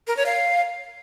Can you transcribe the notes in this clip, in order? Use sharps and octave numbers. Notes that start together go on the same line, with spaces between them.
A#4
C#5
F5